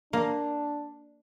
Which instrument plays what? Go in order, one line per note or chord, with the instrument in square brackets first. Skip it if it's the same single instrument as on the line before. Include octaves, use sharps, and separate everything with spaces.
[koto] A#3 [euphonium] D4